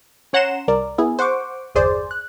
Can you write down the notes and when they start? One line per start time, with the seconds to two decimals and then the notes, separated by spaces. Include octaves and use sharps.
0.33 C#4 C#5 F#5 A#5 C6 E7
0.68 C2 A#4 D5
0.98 B3 E4 G#4
1.19 C5 F#5 C#6 D6
1.75 G1 E2 G#4 C5 D5
2.11 F#6